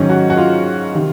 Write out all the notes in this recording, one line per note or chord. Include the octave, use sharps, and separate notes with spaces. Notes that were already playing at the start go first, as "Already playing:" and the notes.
Already playing: G#2 D#3 F#3 C#4
F#4
F#4
F4
C3 D#3